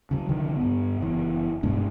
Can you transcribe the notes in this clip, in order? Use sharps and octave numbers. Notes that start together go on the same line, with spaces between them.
C#3 F#3
C2 D3 D#3 F3
G2 B3
F#1 E3 B3
G2 B2 G#3 D4